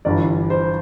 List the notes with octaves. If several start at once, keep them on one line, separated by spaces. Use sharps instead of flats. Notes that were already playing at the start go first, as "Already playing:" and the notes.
G1 G2 E3 D5
C5